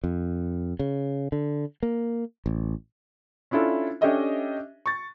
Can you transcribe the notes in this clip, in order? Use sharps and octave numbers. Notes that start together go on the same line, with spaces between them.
F2
C#3
D3
A#3
A1
C#4 D4 E4 F4 A4
C#4 D4 G4 A4 D#5 E5
C#6 A6